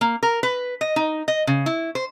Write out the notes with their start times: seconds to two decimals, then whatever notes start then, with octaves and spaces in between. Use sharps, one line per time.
0.01 A#3
0.23 A#4
0.43 B4
0.81 D#5
0.96 D#4
1.28 D#5
1.47 C#3
1.66 E4
1.95 C5